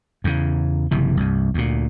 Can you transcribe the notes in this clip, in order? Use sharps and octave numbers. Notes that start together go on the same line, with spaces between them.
E2 C#3
F#1 C3 E3
C2 G2
D2 A#2